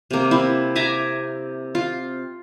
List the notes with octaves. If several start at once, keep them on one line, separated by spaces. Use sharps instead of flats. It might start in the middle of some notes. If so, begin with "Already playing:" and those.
C3 A#3
C4 E4
E5 G#5 A#5 D6
F4